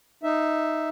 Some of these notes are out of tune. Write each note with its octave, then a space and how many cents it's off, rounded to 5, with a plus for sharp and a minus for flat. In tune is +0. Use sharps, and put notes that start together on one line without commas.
D#4 +0 E5 +0